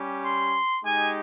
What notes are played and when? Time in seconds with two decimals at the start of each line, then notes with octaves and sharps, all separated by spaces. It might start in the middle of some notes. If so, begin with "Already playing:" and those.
Already playing: G3 C#4 G4
0.23 C6
0.83 G#3 D#4 G4 G#5